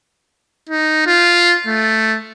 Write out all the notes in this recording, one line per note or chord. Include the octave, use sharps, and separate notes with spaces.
D#4
F4
A3